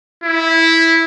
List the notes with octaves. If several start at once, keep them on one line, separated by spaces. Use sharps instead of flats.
E4